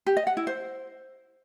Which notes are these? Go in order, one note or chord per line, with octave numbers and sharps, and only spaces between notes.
G4
D#5
F#5
E4
C5